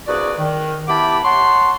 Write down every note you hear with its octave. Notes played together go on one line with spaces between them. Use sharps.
C2 G2 F#4 G#4 B4 D5
D#3
B3 E4 G4 A5 B5 D6
C#5 F#5 A5 C6